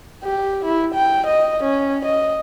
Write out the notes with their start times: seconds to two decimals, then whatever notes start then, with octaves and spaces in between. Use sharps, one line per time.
0.24 G4
0.65 E4
0.95 G5
1.27 D#5
1.64 C#4
2.05 D#5